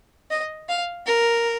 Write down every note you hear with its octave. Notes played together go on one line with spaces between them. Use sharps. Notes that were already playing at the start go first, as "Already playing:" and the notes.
D#5
F5
A#4